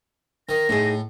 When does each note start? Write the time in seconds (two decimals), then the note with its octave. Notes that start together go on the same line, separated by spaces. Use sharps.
0.49 D#3 A#6
0.69 A2 D#4 G#4